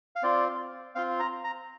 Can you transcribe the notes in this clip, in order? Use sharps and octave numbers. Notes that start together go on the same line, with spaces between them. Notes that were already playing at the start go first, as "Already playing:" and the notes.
F5
C4 F4 D5
C4 F4 F5
A#5
A#5